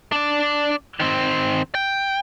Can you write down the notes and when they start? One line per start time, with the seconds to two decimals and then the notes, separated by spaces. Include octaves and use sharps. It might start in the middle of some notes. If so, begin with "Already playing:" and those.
0.12 D4 D5
1.00 D#3 C4
1.75 G5